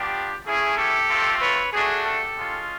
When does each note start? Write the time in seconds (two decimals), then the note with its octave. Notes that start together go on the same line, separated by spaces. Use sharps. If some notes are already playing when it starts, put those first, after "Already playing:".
Already playing: B3 D4 F4 G4
0.45 A3 C#4 E4 G#4
0.78 G4 A4
1.09 A3 C4 F4
1.41 B4 C#5
1.73 A3 D4 F#4 G#4
2.04 G4 A4
2.36 G#3 C#4 F4